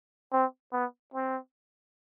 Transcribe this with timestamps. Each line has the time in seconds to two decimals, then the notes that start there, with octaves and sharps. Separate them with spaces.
0.33 C4
0.73 B3
1.14 C4